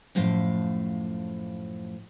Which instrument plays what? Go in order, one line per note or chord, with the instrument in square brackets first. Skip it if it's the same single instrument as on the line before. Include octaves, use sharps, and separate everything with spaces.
[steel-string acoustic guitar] F#2 A2 F3 F5